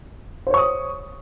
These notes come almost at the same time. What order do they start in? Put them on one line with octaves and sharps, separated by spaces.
C5 C#5 C#6 D#6